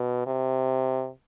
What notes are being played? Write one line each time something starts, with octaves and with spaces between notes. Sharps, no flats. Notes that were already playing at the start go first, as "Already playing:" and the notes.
Already playing: B2
C3